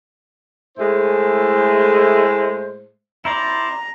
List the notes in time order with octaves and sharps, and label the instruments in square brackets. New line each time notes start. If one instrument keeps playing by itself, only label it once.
[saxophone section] A2 G#3 A3 E4 G#4 C5
[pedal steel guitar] E4 C5 D5 [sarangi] A#5